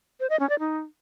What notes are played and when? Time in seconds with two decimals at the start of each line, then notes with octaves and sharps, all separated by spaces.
0.20 C5
0.30 D#5
0.39 C#4
0.49 D5
0.59 D#4